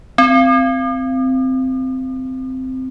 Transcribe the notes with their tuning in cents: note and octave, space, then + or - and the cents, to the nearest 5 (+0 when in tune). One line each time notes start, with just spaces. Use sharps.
C4 -10